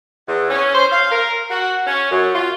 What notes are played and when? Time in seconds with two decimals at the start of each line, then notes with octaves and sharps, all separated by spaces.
0.28 E2
0.50 C#4
0.74 C5
0.91 F5
1.12 A#4
1.50 F#4
1.87 C#4
2.11 F#2
2.35 F4